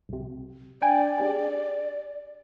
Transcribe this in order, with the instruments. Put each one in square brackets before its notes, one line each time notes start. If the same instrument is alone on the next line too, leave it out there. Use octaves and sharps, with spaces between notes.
[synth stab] C2 C3
[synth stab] D4 G5 G#5 [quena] D5
[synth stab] D4 G4 G#4